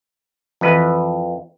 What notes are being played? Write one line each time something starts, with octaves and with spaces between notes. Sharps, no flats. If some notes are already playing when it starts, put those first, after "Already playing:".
F2 E3 B4